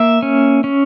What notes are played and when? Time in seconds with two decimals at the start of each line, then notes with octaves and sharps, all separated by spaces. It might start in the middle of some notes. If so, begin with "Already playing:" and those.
Already playing: A#3 E5
0.22 C#4
0.64 C#4